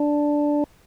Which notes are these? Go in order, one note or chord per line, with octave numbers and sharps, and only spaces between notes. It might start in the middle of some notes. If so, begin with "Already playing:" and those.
Already playing: D4